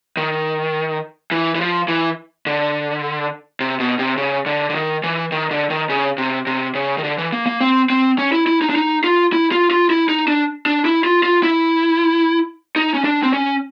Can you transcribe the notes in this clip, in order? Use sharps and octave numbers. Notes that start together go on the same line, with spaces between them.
D#3
E3
E3
F3
E3
D3
C3
B2
C3
C#3
D3
D3
D#3
E3
D#3
D3
D#3
C#3
C3
C3
C#3
D#3
D3
E3
A#3
A#3
C4
C4
C#4
E4
E4
D#4
D4
D#4
F4
E4
F4
F4
E4
D#4
D4
D4
E4
F4
F4
E4
D#4
C#4
D4
C4
C#4